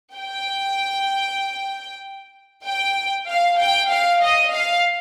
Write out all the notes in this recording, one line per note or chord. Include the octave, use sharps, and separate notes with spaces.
G5
G5
F5
G5
F5
D#5
F5